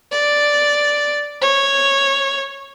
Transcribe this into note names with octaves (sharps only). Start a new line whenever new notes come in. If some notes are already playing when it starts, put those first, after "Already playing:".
D5
C#5